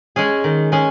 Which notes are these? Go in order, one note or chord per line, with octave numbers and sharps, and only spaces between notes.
G#3 C#4 G#4
D#3
G#3 C#4 G#4